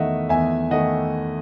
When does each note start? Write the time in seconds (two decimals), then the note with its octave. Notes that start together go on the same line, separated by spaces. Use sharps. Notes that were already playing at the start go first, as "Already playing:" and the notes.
Already playing: E2 D#3 A3 D#5 E5 F#5
0.29 E2 E5 G#5
0.71 D#3 A3 D#5 F#5